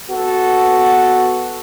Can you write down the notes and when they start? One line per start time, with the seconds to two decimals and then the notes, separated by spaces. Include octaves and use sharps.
0.10 B3 F#4 A4